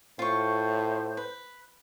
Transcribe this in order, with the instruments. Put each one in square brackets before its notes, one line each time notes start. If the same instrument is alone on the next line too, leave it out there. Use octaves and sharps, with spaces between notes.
[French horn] A2 [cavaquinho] F4 C#6 [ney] C5
[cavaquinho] B4